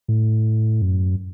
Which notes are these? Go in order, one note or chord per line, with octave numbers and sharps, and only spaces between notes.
A2
F#2